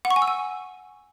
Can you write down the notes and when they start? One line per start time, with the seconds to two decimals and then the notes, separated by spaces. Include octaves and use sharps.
0.05 F#5
0.10 C#6
0.16 G#5
0.22 E6
0.28 G#5